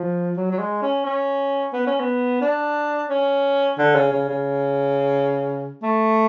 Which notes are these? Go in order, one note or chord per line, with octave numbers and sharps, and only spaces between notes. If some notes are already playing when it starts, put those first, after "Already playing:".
Already playing: F3
F#3
F#3
G#3
C#4
C#4
B3
C#4
B3
D4
C#4
D3
C#3
C#3
C#3
A3